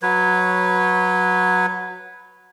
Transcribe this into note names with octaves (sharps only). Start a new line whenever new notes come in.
F#3 B4 C#5